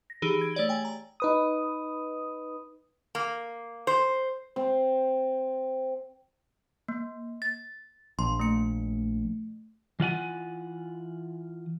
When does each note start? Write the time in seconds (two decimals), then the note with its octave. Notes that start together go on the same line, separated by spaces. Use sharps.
0.10 A#6
0.22 E3 D#4 G4 G#4
0.38 G#6 D7
0.55 A3 C#5 D5 F#7
0.69 G5 G#5
0.85 A#5
1.20 D#4 B4 D#6
3.15 A#3
3.87 C5
4.56 C4
6.88 A#3
7.42 A6
8.19 A#1 C6
8.40 A3 C#7
10.00 E3 F4 F#5 G#5